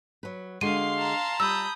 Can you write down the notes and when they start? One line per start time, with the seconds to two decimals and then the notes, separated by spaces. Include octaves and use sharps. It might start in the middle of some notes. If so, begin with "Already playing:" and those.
0.23 F#3 B4
0.61 D3 G#3 F#4 F5 C6 D#7
0.99 A5 A#5
1.40 G3 F4 B5 D#6 E6 G6